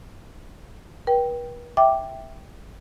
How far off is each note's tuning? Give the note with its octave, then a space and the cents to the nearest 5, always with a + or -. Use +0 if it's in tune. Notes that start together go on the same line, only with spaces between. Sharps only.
B4 -40 G5 +0
E5 -5 G5 +0 D6 +0